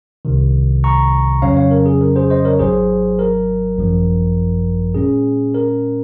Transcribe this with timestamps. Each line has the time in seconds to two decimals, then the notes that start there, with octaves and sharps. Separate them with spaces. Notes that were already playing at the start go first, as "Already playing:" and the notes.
0.25 C2 C3 D#3
0.84 A#5 C#6
1.42 F2 C#3 F#3 C#4 C#5 F5
1.57 C#5 F5
1.71 A#4
1.86 G#4
2.01 A#4
2.16 G#4 C5
2.30 C5 D#5
2.45 A#4 C#5
2.59 G#1 G#2 F#3 G#4 C5
3.19 A#4
3.77 G#1 F#2 F3
4.95 A#2 G#3 C#4 G#4
5.55 A#4